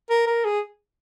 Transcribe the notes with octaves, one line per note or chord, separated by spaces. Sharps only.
A#4
A#4
G#4